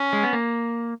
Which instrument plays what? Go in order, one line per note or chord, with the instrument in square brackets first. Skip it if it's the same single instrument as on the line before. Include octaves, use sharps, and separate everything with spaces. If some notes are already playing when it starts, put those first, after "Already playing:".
Already playing: [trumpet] C#4
[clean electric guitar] G#3
B3
A#3